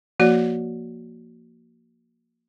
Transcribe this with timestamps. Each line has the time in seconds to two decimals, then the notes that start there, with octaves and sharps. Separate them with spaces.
0.19 F3 A#3 F#4 D5